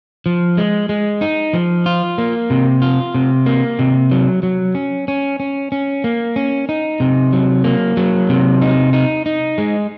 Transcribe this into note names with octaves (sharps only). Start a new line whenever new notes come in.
F3
G#3
G#3
D#4
F3
F4
A#3
C3
F4
C3
A#3
C3
F#3
F#3
C#4
C#4
C#4
C#4
A#3
C#4
D#4
C3
F#3
A#3
F#3
C3
D#4
D#4
D#4
G#3